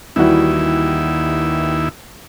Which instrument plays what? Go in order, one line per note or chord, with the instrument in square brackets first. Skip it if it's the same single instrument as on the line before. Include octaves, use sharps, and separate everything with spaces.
[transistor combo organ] D#2 E4 [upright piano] E3 G3 F#4